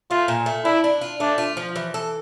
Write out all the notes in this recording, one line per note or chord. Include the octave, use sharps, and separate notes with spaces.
A3 F4
A#2
A3
D4 E4
D4
F4
A3 D4
F4
F3
E3
A4